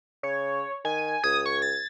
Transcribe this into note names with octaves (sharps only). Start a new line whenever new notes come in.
C#3 C#5
D#3 G#5
C#2 D#6 G#6
C#6
A6